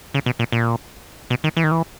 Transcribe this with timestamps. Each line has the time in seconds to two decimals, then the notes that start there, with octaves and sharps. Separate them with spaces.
0.14 C#3
0.26 B2
0.39 A#2
0.52 A#2
1.30 B2
1.44 D#3
1.57 E3
1.64 D#3
1.71 E3